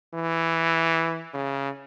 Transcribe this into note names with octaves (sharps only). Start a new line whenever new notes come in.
E3
C#3